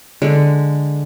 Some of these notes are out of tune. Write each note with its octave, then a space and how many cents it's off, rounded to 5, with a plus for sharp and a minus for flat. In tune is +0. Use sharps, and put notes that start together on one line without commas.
D3 +0 G#3 +0